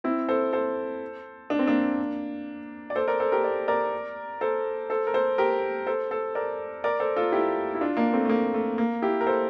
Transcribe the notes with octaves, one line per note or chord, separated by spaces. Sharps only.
C4 E4
A4 C5
A4 C5
D4
C4
A#3 D4
D5
A4 C5
A#4 D5
A4 C5
G4 A#4
D5
A#4 D5
A4 C5
A4 C5
A#4
A4 C5
G4 A#4
A4 C5
A4 C5
A#4 D5
A#4 D5
A4 C5
F4 A4
E4 G4
E4
D4 F4
A#3 D4
A3 C4
A3
A#3
A3
A#3
E4 G4
A#4
A4 C5